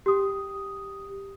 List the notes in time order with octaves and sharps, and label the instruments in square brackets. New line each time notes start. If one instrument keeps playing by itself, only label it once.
[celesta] G4 D#6